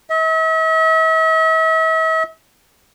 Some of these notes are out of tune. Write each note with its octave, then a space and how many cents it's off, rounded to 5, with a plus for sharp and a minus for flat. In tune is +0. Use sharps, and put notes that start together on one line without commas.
E5 -45